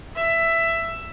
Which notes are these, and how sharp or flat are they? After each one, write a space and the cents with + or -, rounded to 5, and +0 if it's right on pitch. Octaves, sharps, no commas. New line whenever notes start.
E5 +10